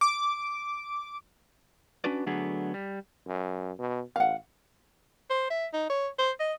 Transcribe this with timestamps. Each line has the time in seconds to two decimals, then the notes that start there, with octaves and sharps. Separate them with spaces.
0.01 D6
2.04 C#4 D4 F#4 B4 D5
2.26 D3 F#3 A3 B3 D4 G#4
2.74 G3
3.26 F#2
3.78 B2
4.16 A1 F5 F#5
5.30 C5
5.50 E5
5.73 D#4
5.90 C#5
6.19 C5
6.40 D#5